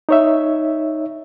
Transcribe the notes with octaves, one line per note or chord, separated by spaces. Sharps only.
D#4 C#5 E5